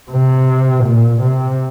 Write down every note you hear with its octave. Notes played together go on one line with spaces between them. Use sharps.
C3
A#2
C3